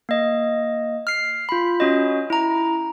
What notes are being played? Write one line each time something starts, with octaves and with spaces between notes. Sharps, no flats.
A#3 D#5
F6 C7
F4 B5
C#4 F#4 D#5
E4 A#5